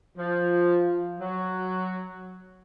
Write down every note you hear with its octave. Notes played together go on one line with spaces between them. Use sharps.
F3
F#3